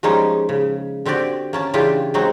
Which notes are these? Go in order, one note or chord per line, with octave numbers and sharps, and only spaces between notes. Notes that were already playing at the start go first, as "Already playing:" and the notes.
F3 G3 G#3 A#3 C#4 D#4
C#3
D3 C4 F#4 G4 D5
A#3 C#4 A5
C#3 E3 D4 E4 F4 G4
F#3 G#3 C4 D#4 F#4